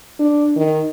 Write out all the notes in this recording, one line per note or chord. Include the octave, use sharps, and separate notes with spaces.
D4
D#3